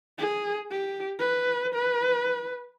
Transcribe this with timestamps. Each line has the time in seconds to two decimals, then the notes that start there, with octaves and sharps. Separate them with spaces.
0.18 G#4
0.71 G4
1.19 B4
1.74 B4